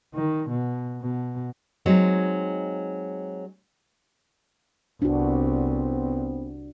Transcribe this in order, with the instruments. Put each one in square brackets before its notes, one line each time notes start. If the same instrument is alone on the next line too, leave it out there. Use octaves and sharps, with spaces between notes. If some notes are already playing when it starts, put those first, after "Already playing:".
[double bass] D#3
B2
B2
[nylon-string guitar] F#3 G#3 C4 D#4
[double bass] C2 [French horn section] B3 C4 [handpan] D4 F#4